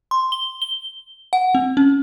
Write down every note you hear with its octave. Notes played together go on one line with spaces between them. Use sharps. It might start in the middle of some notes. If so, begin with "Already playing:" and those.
C6
G7
G7
F#5
C4
C#4